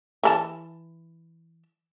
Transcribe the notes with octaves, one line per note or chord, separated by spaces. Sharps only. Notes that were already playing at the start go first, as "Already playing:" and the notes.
E3 A4 A5